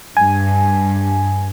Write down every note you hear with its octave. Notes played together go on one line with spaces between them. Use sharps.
G2 G#5